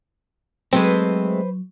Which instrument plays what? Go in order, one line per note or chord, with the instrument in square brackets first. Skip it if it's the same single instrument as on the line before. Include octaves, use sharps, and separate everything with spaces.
[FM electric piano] F#3 [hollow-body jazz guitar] G#3 A3 C4 [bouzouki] B4 C5